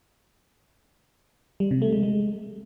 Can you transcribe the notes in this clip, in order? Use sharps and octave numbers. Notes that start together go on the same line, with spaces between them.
G3
C3
A3
G#3
G#3